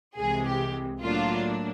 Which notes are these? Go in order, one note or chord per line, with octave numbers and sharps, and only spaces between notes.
C2 C3 E3 G#3 G#4
G4
A2 F#3 A#3 D4 F4